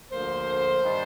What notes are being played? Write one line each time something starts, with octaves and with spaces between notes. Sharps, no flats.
D2 D3 F3 A#3 C5
G2 D#3 G3 D4